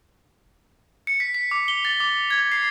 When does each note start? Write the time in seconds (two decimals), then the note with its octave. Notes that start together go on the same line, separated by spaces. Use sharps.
1.07 C#7
1.20 B6
1.34 B6
1.51 D6
1.68 G7
1.85 A6
2.00 D6
2.31 G#6
2.52 C7